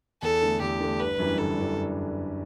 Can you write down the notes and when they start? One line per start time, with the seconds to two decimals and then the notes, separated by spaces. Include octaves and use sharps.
0.22 E2 A4
0.42 D3 A3
0.61 E2 G4
0.80 D3 A3
1.00 G1 B4
1.19 F#2 E3 G3 D4
1.38 G1 A4
1.58 F#2 E3 G3 D4